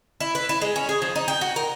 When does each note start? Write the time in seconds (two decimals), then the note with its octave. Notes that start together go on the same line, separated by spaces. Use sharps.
0.20 E4
0.35 B4
0.49 E4
0.62 G#3
0.76 C#4
0.89 G#4
1.02 F3
1.16 D#4
1.28 G5
1.41 F#4
1.56 A#4